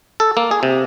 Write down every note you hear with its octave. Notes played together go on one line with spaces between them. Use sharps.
A4
A#3
G#4
C3